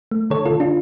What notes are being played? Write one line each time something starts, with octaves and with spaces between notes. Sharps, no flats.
A3
D3 A4 C#5
D3 F4 A4
D4 F4